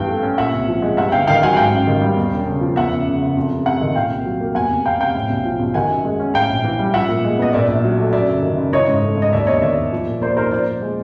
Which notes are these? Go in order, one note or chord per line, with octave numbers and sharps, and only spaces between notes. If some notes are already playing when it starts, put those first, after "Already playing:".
Already playing: G2 E3 B3 F5 G5
A3
C#4
A#2 E5 F#5
C2
F3
G#3
G2 E5 F#5
G1 F5 G5
D#3 F5 G5
F#3 F#5 G#5
G#2 F5 G5
A1
D#3
G3
E2
E1
C#3
F3
E2 E5 F#5
F#1
C#3
F#1
F2
F1
C3 E5 F#5
D#3
A#2 F5 G5
C2
F#3
A#3
E2 F#5 G#5
F1
C3 F5 G5
F1 F5 G5
A2
B1
F3
B1
D#3 F#5 G#5
F#2
G#3
C#4
A2 F5 G5
A#1
E3
G3
F3 E5 F#5
A#2
G#3
B3 D#5
A#2 D5 E5
A#1
F#3
A3
F#2 D5 E5
F#1
D#3
F#1
E3 C#5 D#5
G#2
A3
G#2
D#5
D#2 D5 E5
E1 C#5 D#5
D#3 D5 E5
E1
F3
A#2
A#3 C5 D5
D#4 A#4 C5
F3 C5 D5
A#2
G#3